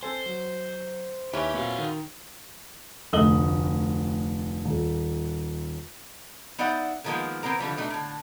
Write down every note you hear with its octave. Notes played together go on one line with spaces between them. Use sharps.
C4 A4 C5 G#5
F#3
D#2 E3 C#4 E4 G4
A#2 C4 F#4 F5
D#3
F1 D2 D#5 D#6 F#7 G7
D#1
B3 D#4 D5 E5 F#5
D3 D#3 F3 G#3 A#3 B3
E3 B3 C4 A#4 A#5
D3 E3 F3 G3
B2 A3 D4 D#4
A2 D3